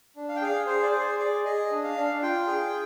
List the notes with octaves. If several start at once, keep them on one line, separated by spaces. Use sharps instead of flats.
D4
F5
G5
G#4 F5
G#4 C5
D5
G#4 C5
G#4 D5
G#4 D#5
D4
F5
D4
F4 G5
G#4